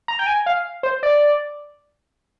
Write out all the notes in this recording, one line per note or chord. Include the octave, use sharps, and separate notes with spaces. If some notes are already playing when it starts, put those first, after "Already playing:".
A#5
G5
G#5
F5
C5
D5